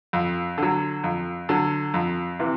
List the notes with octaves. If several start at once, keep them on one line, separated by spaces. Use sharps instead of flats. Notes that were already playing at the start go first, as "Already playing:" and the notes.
F2
D3 F#3
F2
D3 F#3
F2
C3 E3